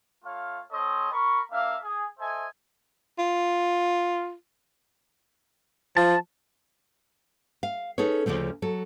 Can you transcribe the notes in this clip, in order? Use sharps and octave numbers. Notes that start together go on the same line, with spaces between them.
A3 F4 C#5 F5
C4 A4 C5 C#5 D#5
A#4 B5 C#6
A#3 D4 E5 F5
G#4
A4 C5 D#5 E5 G#5
F4
F3 A5
F5
C#4 D#4 G#4 A4 B4 C#5
D2 G#2 C#3 F3 A3
F#3 A4